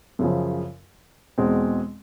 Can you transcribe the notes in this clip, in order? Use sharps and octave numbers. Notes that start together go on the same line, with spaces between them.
F#2 C#3 F3
E2 B2 G#3 C4